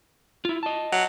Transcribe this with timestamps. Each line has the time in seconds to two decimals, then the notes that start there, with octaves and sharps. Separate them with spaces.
0.45 E4 F4
0.63 D#5 A5
0.92 F#3